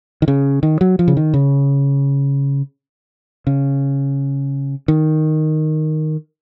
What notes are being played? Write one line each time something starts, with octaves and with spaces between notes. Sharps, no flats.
D#3
C#3
D#3
F#3
F3
C#3
D#3
C#3
C#3
D#3